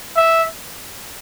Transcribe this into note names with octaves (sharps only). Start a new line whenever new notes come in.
E5